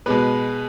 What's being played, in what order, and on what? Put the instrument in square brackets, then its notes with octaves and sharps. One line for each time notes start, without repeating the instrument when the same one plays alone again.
[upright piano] B2 G#3 B3 B4